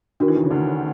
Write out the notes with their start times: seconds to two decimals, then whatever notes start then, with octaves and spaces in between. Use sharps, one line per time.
0.20 D#3 D4 F#4 A#4
0.28 E3
0.36 D#2 D#3
0.43 C#3
0.50 D2 D3